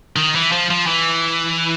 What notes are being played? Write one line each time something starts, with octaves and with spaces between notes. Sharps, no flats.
D#3
E3
F3
F3
E3